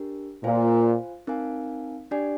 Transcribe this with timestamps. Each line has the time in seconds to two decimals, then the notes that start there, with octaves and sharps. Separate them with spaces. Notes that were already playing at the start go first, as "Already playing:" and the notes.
Already playing: D4 G4 A#4
0.44 A#2 F4 C5 F5 G#5
1.27 C4 D#4 A#4 F5 G#5
2.11 D4 G4 D5 G#5